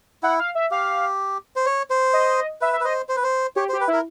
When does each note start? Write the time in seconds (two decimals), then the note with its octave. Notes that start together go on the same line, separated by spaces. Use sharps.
0.23 E4 F#5
0.39 F5
0.55 E5
0.71 G4 F5
1.56 C5
1.66 C#5
1.90 C5
2.13 D#5
2.61 B4 E5
2.73 E5
2.80 B4
2.85 C5 D#5
3.09 C5
3.16 B4
3.24 C5
3.56 G4 C#5
3.69 C5
3.73 G4
3.81 B4
3.88 E4 A#4